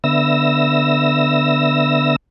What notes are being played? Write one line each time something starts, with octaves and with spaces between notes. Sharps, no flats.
D3 B3 E5 E6 A#6